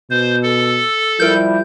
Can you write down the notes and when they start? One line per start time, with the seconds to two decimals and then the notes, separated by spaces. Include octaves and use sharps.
0.11 B2 C5
0.43 A4
1.20 F3 G3 E4 A#4 G6